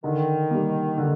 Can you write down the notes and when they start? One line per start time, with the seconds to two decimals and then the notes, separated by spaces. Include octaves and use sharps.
0.04 D3 D#3
0.51 G3 A#3
0.98 D3